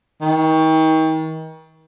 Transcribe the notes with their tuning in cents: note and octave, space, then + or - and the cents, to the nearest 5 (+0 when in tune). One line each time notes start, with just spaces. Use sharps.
D#3 +35